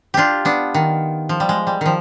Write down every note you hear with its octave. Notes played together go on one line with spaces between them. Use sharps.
D4 F4 G4
B3 D4
D#3
F3
G3
G#3
G3
D#3 F3